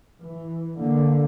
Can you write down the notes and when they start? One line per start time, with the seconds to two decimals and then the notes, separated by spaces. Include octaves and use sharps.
0.22 E3
0.79 D3 A#3